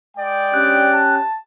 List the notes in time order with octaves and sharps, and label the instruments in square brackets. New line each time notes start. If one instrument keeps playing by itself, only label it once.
[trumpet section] G#3 D5 G5
[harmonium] C#4 G4 [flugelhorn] D4 [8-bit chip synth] F#6
[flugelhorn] A5